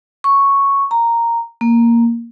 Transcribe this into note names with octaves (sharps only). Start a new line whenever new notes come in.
C#6
A#5
A#3